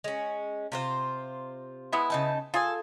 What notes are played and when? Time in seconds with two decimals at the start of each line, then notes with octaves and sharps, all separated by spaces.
0.04 G#3 C#4
0.72 C3 F4 C5
1.93 G#3 B3 E4
2.10 C#3 D#4 A5
2.54 F4 G#4 A4 G#5